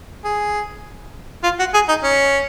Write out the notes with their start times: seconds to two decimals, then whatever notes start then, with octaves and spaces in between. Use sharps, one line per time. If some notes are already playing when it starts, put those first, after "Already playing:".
0.25 G#4
1.44 F4
1.59 F#4
1.74 G#4
1.89 D#4
2.04 C#4